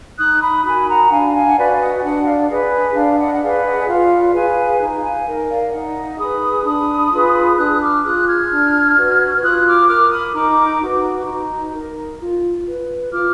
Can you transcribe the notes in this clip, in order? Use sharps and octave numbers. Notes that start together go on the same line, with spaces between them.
D#4 D#6 F#6
B5 D#6
F#4 A#4 G#5 B5
F#5 A#5
D4 F5 G#5
F5 G#5
F#5
F#4 B4 D5 F5
G#5
D#5 F#5
D4 D#5 F#5
D5 F5
G#4 B4 D#5
D#5
D4 D5 F5
D#5 F#5
F#5
G#4 B4 D5 F5
D#5 F#5
F4 D5 F5
G#4 B4 F5 G#5
D#4
F5 G#5
A#4 D#5
D5 F5
D#4 D#5 F#5
G#4 B4 B5 D#6
D4 B5 D#6
F4 G#4 B4
D4 D#6 F#6
D6 F6
F4 G#4 D#6 F#6
F6 G#6
D4
F#4 B4
F4 D#6 F#6
D6 F6
A#4 D6 F6
B5 D#6
D#4 A#5 D6
F#4 B4
D#4
A#4
F4
B4
F4 D6 F6